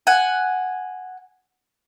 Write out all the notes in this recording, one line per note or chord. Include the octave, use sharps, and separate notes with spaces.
F#5 G#5